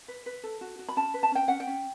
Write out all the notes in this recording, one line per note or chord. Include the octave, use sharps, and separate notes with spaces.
B4
B4
A4
F#4
F#4
B5
C#4 A5
B4
A5
C#4 G5
C#4 F#5
G5
C#4